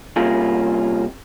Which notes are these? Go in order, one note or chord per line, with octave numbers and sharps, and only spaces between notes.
C3 G3 A#3 C#4 F4 G#4